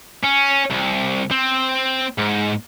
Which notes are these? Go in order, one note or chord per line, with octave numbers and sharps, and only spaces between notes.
C#4
C2
C4
G#2